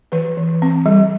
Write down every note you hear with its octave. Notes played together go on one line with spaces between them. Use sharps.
E3 B4
E3
C4
G3